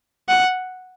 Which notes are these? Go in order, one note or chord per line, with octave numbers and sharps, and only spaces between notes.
F#5